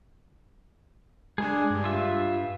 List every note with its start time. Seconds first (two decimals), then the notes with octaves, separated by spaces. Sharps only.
1.38 G#3 D4 G#4
1.71 G2
1.84 F4 E5